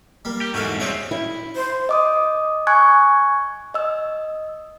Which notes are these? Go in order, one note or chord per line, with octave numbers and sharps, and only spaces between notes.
G3 A#3
G4
E2 G#2 F#4 A4 F5
G2 C4 G#4 C#5 E5
E4 E5
C5
D#5 D6 D#6
G#5 C#6 F#6 G#6
D#5 E6